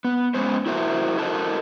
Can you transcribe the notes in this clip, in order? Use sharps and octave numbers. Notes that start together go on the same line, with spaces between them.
B3
G#3 B3 C#4 C5
E4 F#4 A#4 C5 E5
E4 F#4 A4 A#4 C5 D#5